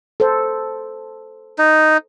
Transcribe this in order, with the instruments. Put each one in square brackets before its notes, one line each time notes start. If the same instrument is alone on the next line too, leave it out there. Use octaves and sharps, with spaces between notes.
[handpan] A4 C5
[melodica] D#4